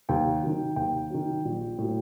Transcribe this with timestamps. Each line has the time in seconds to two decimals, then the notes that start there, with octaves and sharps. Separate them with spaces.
0.09 D#2 G5
0.42 D#3 F#3
0.76 D#2 G5
1.10 D#3 F#3
1.45 A#1
1.78 A2 F#3